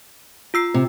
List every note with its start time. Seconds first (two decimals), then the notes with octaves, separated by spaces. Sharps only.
0.54 F4 E6 C7
0.74 C3